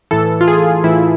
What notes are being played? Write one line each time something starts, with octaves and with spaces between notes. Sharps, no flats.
A2 E3 A4
F4
G#4
A2 E3 E4